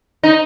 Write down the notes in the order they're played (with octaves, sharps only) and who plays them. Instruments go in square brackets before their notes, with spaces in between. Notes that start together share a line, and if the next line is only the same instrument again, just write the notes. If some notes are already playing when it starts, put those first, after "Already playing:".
[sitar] D#4